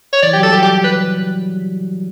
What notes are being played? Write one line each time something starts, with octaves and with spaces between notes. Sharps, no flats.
C#5
E3 D5
G4
F#3
A4
G3 G4
G4
B4